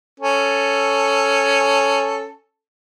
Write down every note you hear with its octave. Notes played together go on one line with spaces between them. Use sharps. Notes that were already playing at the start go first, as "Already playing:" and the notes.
C#4 A4